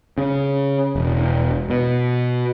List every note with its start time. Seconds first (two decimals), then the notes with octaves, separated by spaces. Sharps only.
0.18 C#3
0.96 E1
1.70 B2